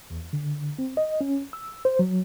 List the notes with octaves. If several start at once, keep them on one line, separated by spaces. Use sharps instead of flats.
E2
D3
C4
D#5
C#4
E6
C5
F#3